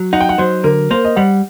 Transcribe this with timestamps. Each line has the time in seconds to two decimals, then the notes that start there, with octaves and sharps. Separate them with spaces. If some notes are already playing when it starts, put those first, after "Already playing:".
Already playing: F#3
0.13 D#4 F#5
0.21 G5
0.29 F#5
0.38 F#3 C5
0.64 D3 A#4
0.90 A#3 C5
1.05 D#5
1.16 G3 F#5